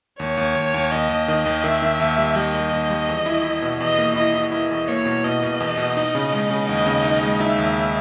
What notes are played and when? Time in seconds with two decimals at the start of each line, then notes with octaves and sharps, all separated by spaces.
0.20 D#2 C#5
0.37 D#2
0.56 D#2
0.74 D#2
0.92 D#2 D#5
1.09 D#2
1.28 D#3
1.46 D#2
1.64 D#3 E5
1.82 D#3
2.00 D#2
2.18 G3
2.36 G3 D#5
2.54 G3
2.72 D#2
2.91 G3
3.09 E2
3.26 E4
3.44 E4
3.62 B2
3.80 E2 D#5
3.98 A#3
4.15 E4 D#5
4.34 E4
4.52 E4 D#5
4.71 E2
4.88 A#3 C#5
5.06 B2
5.24 B2 D#5
5.42 B2
5.60 E2
5.78 B2
5.97 D#4
6.15 C#3
6.33 G#3
6.51 C#3
6.68 D#2 D#5
6.87 C#3
7.04 D#4
7.23 G#3
7.40 D#4 E5
7.58 D#2